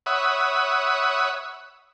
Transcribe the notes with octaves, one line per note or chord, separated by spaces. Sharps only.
C#5 E5 F#5 B5 D#6